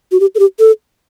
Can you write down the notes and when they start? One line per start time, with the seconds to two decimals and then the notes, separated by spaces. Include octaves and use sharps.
0.12 F#4
0.20 G4
0.35 A4
0.39 G4
0.59 A4